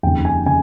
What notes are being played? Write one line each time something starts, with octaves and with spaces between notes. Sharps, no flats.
F1 D#2 C#3 G5
G#5
C#3 G#5